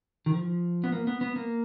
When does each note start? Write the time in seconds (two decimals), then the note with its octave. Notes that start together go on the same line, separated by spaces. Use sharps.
0.26 D#3
0.34 F3
0.84 B3
0.92 A#3
1.07 B3
1.21 B3
1.36 A#3